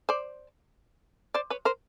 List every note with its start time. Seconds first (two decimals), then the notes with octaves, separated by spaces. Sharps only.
0.09 C5 D5
1.34 C5 D5
1.50 B4 C#5
1.65 A#4 C5